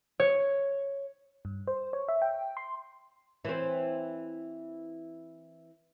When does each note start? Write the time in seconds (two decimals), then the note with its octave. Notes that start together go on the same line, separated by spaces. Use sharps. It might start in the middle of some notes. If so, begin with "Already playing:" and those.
0.20 C#5
1.45 G2
1.68 C5
1.93 C#5
2.09 E5
2.22 G5
2.57 C6
3.45 E3 C4